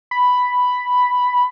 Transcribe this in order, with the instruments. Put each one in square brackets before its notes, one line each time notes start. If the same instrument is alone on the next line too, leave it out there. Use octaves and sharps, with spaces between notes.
[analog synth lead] B5